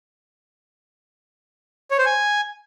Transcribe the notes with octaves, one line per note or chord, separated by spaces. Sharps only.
C#5
C5
G#5